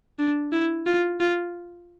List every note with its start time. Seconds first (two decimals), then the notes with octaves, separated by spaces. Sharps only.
0.19 D4
0.52 E4
0.86 F4
1.20 F4